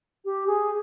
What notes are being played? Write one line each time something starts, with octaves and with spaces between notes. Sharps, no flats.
G4
G#4